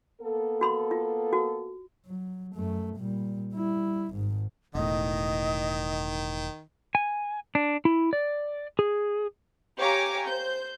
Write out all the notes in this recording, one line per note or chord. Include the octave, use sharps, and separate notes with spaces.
A#3 B3 A4
F#4 B5 C6
F4
F#4
F#3
F#2 A3
A#2 G3
G3 E4
G#1 G#2
E1 A2 D#3 D#5
G#5
D4
E4
D5
G#4
G4 C#5 F5 G#5 A#5 D6
C5 G6